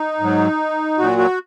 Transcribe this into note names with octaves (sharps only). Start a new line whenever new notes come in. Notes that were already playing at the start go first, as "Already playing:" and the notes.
Already playing: D#4
G#2 F#3
A#2 F#3 F#4
F#4